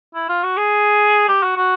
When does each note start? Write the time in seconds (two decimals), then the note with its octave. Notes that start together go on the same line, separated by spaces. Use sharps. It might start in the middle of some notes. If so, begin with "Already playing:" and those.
0.15 E4
0.29 F4
0.43 F#4
0.57 G#4
1.28 G4
1.43 F#4
1.57 F#4